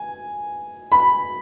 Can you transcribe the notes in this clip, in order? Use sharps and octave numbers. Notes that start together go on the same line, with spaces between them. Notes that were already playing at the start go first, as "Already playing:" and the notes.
Already playing: G#5
B5